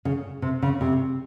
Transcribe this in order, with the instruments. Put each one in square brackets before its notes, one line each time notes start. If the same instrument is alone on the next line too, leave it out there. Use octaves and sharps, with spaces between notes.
[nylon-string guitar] C#3
C3
C#3
C3